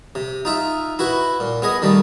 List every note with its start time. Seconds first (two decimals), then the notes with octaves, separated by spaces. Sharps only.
0.15 C3
0.45 D#4 F4 E5
0.99 E4 F#4 B4
1.40 A#2
1.62 B3 G#4 D#5
1.82 D#3 G3 A3